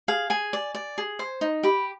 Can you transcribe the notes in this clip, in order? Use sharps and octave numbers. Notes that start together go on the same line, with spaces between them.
G#4 F5
G#4 G#5
D5
D5
G#4
C5
D#4
G4 B5